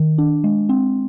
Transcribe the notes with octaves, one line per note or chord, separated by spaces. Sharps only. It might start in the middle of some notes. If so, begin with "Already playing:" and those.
Already playing: D#3
D4
G#3
C4